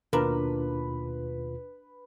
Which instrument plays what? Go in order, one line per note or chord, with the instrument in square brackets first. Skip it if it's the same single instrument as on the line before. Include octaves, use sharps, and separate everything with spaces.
[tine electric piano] D#2 B2 F4 [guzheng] D4 [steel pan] A#4 [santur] B4